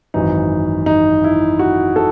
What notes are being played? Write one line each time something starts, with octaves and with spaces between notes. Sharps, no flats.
G#1 F#2 E3 D#4
D#4
E4
F#4
A4